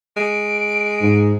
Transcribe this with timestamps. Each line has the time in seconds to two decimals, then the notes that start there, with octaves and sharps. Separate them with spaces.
0.17 G#3 D7
1.01 G#2